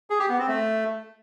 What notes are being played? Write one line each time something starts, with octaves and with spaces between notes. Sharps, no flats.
G#4
G4
B3
C4
A3